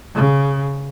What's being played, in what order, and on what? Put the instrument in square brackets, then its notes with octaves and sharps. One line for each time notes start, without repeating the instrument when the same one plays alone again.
[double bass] C#3